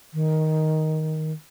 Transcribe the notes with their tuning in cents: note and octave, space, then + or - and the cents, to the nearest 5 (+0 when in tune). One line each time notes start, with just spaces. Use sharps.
D#3 +10